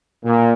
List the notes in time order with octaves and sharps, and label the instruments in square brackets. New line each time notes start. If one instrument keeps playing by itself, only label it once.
[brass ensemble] A#2